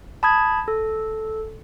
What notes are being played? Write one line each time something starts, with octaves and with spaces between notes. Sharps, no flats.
A5 B5 D#6 G#6
A4